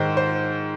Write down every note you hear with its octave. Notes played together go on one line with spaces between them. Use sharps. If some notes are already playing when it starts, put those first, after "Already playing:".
Already playing: G#2 D#3 C5
C5